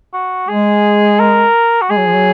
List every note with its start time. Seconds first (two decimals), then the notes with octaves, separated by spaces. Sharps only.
0.14 F#4
0.48 G#3 G#4
1.19 A#4
1.82 F#4
1.90 G#3 G#4
1.98 F#3
2.06 F3
2.14 F#3